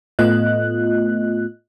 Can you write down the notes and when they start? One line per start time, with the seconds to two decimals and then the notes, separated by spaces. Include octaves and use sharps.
0.19 A2 A3 B3 F4 D#5 F#6